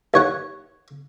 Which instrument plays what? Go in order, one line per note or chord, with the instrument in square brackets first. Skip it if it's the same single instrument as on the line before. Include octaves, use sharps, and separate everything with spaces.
[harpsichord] D#2 C#5 F#5